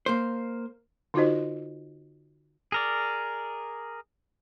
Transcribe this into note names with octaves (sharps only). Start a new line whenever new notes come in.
A#3 C5
D3 D#4 F4 F#4 C5 D#5
G#4 A#4 D5